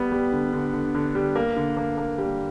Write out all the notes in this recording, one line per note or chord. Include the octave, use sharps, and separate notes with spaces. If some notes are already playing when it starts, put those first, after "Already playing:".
Already playing: G3 B3
G3
D3
D3
D3
D3
G3
A#3
D3
A#3
A#3
G3